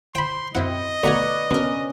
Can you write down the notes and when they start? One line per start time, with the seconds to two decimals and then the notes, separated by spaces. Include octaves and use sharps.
0.15 C5 G5 B5 C6
0.55 F#2 C4 E4 D#5 F#5
1.03 B1 A3 B4 D5 F#5 G#5 A#5 C#6
1.51 B2 D3 C#4 A#4